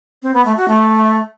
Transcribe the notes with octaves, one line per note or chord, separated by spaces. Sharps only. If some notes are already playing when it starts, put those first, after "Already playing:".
C4
B3
A3
F#4
A3